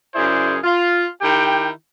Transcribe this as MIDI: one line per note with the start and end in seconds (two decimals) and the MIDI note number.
0.15 0.57 42
0.15 0.57 49
0.15 0.57 64
0.15 0.57 68
0.15 0.57 72
0.15 0.57 74
0.64 1.06 65
1.22 1.69 51
1.22 1.69 64
1.22 1.69 67
1.22 1.69 79